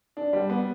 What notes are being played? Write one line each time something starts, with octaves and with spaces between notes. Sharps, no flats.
D4
G3
B3